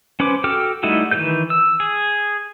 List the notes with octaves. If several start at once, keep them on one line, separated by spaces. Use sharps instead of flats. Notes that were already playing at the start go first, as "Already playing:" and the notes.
C#4 B4 C5 D6
F#4 A4 G5 D6 F6
G3 A3 D#4 E4 F#4
D#3 E3 A4 B4 G6
E6
G#4